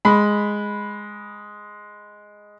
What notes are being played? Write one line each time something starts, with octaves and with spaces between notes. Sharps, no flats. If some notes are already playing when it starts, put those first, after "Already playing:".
G#3 B5